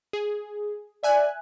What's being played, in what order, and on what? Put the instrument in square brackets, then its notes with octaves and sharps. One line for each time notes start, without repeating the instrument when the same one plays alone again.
[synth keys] G#4
[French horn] D5 [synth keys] E5 G#5 F#6